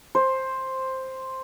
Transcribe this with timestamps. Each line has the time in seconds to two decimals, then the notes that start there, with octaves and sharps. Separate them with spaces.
0.15 C5